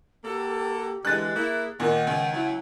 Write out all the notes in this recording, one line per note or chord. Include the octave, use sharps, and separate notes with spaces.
A#3 F#4 G4 A4
D3 E3 G#3 F#6 A6
A#3 E4 G#4
A#2 D#3 F#5
C#2
F#3 E4